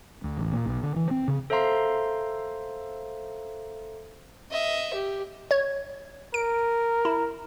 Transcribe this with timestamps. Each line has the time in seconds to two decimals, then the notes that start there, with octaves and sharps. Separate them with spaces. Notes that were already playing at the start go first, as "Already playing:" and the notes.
0.24 D2
0.37 A1
0.53 A#2
0.66 B1
0.83 D3
0.96 E3
1.11 C4
1.28 C#3
1.50 A4 C5 E5 F5 A#5 C6
4.51 D#5 E5
4.93 G4
5.51 C#5 G#6
6.34 A#4 D7
7.05 E4